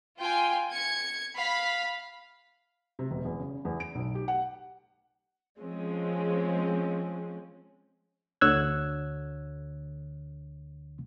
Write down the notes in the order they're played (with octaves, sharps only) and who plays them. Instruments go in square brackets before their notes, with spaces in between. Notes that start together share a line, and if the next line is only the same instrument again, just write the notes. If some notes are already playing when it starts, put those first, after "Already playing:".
[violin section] F4 G5 G#5
G#6 C#7
F5 B5
[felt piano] C3
E1
E2
C#3
E2
D7
B1
G4
F#5
[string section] F3 G#3 C4 C#4
[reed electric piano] D2 D3 C#5 E6 F#6 G#6